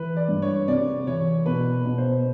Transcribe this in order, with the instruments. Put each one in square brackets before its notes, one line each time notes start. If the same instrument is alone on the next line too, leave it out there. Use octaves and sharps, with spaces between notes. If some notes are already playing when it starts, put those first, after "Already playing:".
Already playing: [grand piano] E3 [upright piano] B4
[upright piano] D5
[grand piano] G2
[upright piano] C#5
[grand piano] C3 [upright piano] D5
[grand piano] E3 [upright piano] C#5
[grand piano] B2 [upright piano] B4
[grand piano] B2
[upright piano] C5